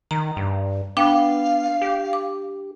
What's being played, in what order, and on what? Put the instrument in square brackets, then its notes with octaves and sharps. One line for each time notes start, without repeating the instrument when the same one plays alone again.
[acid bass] D#3 [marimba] A#5
[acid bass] G2
[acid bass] B3 [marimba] D4 G5 D6 [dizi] F5
[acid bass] G4
[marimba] D6